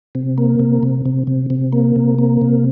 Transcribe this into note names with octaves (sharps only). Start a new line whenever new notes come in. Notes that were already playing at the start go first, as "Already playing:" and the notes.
C3
A#3
C3
C3
C3
C3
C3
A#3
C3
A#3
C3